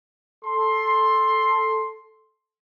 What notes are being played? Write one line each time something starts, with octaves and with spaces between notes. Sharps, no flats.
A4 C6